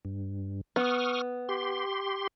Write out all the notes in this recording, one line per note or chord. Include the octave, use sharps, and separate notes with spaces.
G2
B3 C#6 D#6 F6
G4 C6